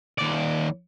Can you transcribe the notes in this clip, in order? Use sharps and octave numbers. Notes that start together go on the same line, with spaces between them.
D#2 D5